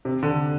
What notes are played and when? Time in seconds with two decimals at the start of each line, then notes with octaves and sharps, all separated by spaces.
0.05 C3
0.23 D3